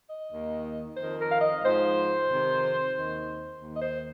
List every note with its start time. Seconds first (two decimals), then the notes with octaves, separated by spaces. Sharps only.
0.09 D#5
0.32 D#2 D#3
0.96 F2 D#3 C5
1.19 A#4
1.32 F5
1.40 D#5
1.63 G#2 F3 C5
2.28 F2 C3 D#3
2.94 D#2 D#3
3.60 D#2 D#3
3.75 D#5
3.81 C5